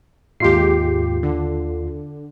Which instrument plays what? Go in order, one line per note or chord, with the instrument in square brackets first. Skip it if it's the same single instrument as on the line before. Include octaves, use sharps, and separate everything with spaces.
[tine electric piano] D#2 F4 C7 [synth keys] G#2 G4
[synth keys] D3